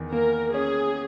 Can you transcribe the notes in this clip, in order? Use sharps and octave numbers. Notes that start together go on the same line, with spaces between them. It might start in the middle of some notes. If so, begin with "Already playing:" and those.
Already playing: E2 D#3
A#3 A#4
C#4 G#4